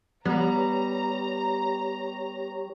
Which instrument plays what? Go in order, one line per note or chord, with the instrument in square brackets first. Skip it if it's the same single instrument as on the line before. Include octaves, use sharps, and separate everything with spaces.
[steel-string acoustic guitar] G3 [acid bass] B3 [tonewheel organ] G4 C#5 [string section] A#5